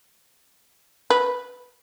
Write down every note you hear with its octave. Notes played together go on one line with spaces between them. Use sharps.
B4